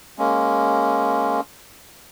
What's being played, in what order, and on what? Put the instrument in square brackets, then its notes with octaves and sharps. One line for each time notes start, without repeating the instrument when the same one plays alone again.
[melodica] G#3 A#3 C#4